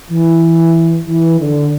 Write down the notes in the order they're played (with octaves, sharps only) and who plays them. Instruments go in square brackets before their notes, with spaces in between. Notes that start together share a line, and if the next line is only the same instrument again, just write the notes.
[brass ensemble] E3
E3
D3